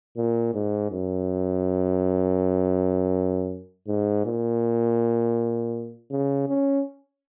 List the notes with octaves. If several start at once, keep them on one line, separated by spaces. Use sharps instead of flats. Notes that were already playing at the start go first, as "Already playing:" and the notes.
A#2
G#2
F#2
G#2
A#2
C#3
C#4